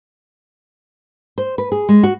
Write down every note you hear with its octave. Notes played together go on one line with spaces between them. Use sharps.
C5
B4
G#4
G#3
F#4